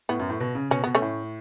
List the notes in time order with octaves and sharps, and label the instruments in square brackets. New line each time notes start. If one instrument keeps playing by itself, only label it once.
[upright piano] A2 [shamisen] B3
[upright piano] F#2
A2
B2
C#3
[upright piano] B2 [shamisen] C#4
[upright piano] B2 [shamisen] B3
[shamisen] A3 C#4
[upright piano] A2